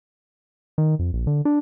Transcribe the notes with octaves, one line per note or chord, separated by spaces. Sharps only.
D#3
F2
A#1
D3
D4